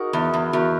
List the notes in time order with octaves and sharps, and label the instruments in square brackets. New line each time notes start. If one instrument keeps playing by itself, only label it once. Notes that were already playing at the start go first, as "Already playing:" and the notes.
Already playing: [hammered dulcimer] D#4 F#4 G#4 A#4
[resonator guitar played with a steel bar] E2
E2
[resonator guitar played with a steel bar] E2 [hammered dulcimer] F#4 A#4